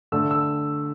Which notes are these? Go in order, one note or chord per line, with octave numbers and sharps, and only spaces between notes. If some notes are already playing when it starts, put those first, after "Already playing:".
D3 A3 E6
E6